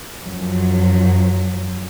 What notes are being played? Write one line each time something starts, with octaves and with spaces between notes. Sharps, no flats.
F#2 F3 F#3